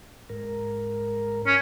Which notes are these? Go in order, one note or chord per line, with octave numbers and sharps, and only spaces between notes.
G#2 A#4
C#4